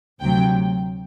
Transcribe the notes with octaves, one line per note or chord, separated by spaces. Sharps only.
D2 C3 F#3 G5